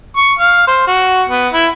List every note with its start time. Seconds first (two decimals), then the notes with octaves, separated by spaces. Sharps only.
0.17 C#6
0.39 F5
0.68 C5
0.87 F#4
1.29 B3
1.53 E4